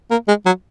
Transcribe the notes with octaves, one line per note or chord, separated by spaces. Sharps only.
A#3
G#3
F#3